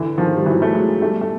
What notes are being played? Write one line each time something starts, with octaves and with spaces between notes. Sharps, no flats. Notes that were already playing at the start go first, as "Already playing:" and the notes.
Already playing: D3 E3
D#3 F3
G3
E3 F#3
A3
F#3 G#3
G3 A3
A3